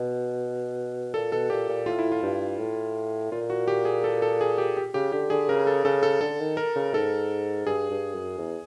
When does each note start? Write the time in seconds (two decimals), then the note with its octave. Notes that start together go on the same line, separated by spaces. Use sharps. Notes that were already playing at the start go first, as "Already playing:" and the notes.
Already playing: B2
1.14 A#2 A4
1.32 B2 A4
1.50 A#2 G4
1.69 A#2
1.86 A2 F4
1.99 E4
2.12 F4
2.23 G2
2.59 A2
3.31 A#2 F4
3.50 F#4
3.68 G4
3.85 G#4
4.04 A4
4.22 A4
4.41 G#4
4.58 G4
4.77 G4
4.94 C#3 G4
5.12 D3 G4
5.30 D3 G#4
5.49 C#3 A#4
5.67 A4
5.85 C#3 A4
6.03 A4
6.21 D3 A4
6.39 D#3
6.57 A#4
6.76 C#3
6.94 G#2 A4
7.66 G2 G#4
7.90 G2
8.15 F#2
8.38 E2